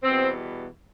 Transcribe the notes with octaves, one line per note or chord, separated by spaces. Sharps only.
E2 B2 G3 C4